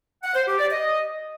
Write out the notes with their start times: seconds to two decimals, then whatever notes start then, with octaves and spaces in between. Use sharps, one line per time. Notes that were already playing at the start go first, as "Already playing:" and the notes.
0.23 F#5
0.35 C5
0.47 G4
0.58 D5
0.70 D#5